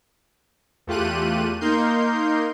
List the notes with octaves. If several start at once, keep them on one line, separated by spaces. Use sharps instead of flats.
E2 A3 F4 G4 F#6 D#7
A#3 D#4 A#4 C6 G6